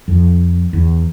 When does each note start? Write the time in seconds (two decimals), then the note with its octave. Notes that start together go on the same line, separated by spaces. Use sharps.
0.08 F2
0.73 E2